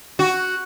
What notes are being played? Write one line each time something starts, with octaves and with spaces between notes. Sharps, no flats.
F#4